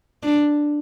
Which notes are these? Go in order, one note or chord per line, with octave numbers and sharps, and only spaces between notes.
D4